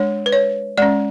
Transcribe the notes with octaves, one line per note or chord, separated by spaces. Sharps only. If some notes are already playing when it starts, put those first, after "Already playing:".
Already playing: G#3 D4 C#5
B4
C#5
G#3 C#4 D5